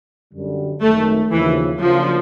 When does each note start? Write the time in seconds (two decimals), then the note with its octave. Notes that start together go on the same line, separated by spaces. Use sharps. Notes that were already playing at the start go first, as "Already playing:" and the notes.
0.34 F#2 D3 G3
0.82 G#1 F#2 D#3 A3
1.31 D#2 C#3 E3 F3
1.80 C#3 F3 F#3 A#3 D4 F4